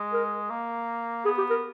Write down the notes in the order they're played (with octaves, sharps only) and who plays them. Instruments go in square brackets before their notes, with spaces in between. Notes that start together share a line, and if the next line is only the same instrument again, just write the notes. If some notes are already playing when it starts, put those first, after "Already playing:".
Already playing: [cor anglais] G#3
[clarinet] A#4
[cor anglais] A#3
[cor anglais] B3 [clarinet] G#4
[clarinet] G4
A#4